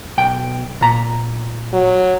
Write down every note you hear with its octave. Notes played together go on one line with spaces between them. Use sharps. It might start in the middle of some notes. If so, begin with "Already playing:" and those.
B1 G5
A#2 A#5
F#3